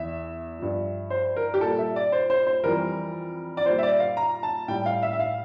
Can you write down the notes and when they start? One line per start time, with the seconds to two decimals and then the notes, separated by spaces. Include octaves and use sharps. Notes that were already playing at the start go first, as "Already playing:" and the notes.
Already playing: E2 E3 E5
0.59 G2 F3
1.10 C5
1.36 A#4
1.54 G4
1.61 A#2 G3 A4
1.78 E5
1.96 D5
2.12 C5
2.30 C5
2.47 C5
2.64 F2 E3 G3 A#4
3.57 D5
3.66 A#2 G3 C5
3.78 E5
3.83 D5
4.00 F5
4.17 A#5
4.43 A5
4.68 A2 G3 G5
4.86 F5
5.03 E5
5.13 E5
5.20 F5